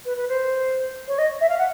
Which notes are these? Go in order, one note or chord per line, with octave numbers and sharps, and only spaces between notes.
B4
B4
C5
C#5
D#5
E5
F5
F#5